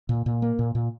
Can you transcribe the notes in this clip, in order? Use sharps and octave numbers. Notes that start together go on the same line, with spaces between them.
A#2
A#2
A#3
A#2
A#2